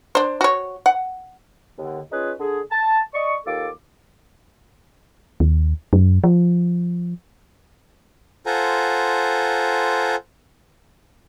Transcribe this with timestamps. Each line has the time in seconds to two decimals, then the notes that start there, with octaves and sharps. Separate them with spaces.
0.15 D4 C5
0.41 F#4 C#5
0.86 F#5
1.78 D#2 D3
2.12 C#4 D#4 F4 G#4 B4
2.40 D3 G#4
2.71 A5
3.14 D5 D#5 C#6
3.46 D#2 F4 A4 D6
5.40 D#2
5.93 F#2
6.24 F3
8.46 F4 A4 C5 F#5 G#5 A#5